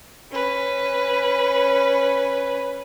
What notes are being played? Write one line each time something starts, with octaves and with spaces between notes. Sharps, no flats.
C#4 B4